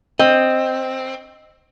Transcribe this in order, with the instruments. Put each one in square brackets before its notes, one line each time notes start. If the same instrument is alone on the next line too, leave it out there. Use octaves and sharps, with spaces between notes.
[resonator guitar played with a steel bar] C4 [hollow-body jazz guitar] D#5